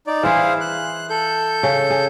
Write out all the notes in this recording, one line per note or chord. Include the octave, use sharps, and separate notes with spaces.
D#4 D5
E3 E4 G#4 C5 F5
F#6
A4 G6
C#3
G#4